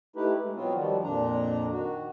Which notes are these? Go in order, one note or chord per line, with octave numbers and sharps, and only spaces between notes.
A3 D#4 E4 G4 B4
G#3
B2 F#3 B3 C4 F4 F#4
D#3 F3 G3
F2 A#2 D4 A#5
D#3 F#4